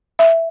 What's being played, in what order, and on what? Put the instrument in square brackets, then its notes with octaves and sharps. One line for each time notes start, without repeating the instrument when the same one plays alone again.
[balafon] E5